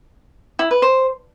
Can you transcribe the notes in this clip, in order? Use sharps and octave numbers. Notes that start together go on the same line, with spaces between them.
E4
B4
C5